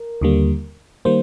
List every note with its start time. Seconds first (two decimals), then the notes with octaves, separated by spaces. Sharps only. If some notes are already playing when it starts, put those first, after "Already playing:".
Already playing: A#4
0.21 D#2 D3 G3 A#3
1.05 D#3 G3 A#3 C5